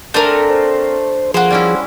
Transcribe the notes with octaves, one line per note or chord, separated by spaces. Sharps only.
A3 C4 D4 A#4 G#5
C5
F3 A#3 F#4 G#4 C5
G3 C#4 E4